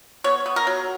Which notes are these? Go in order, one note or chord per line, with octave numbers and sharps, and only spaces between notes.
B3 C#5
B3
A#4
F#3